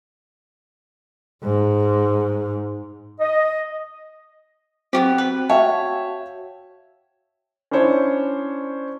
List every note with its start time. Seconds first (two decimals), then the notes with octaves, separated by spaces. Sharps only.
1.43 G#2
3.20 D#5
4.93 F#3 B3 C4 D4 G4
5.18 B4
5.50 F#4 C#5 E5 F5 G5 A5
7.71 C#4 D4 E4 C5 C#5